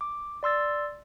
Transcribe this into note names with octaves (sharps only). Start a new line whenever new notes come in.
D6
D5 C6 E6 A6